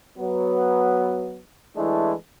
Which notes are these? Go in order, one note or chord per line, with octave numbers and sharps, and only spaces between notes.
F#3 B3
E3 G#3 A3 D4 E4